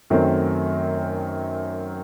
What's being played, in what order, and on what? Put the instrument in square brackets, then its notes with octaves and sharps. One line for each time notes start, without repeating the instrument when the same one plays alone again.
[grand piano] F#2 D#3 F#3 A3 C4